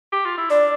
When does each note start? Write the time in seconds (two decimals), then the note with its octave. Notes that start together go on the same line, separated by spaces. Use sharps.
0.12 G4
0.25 F4
0.38 E4
0.50 D4 D5